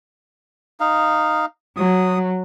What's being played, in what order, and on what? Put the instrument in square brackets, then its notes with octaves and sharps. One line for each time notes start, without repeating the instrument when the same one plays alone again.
[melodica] D#4 F5
[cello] F#3 [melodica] D#6